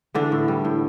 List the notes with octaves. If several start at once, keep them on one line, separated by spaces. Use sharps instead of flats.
D3 E3 D4
A2
G3
A2